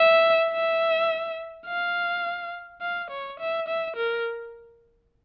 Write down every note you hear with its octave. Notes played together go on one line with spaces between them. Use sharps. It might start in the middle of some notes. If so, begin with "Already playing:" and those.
Already playing: E5
E5
F5
F5
C#5
E5
E5
A#4